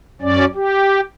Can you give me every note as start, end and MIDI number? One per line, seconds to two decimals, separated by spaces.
0.22 0.45 42
0.22 0.45 61
0.22 0.45 74
0.55 1.01 67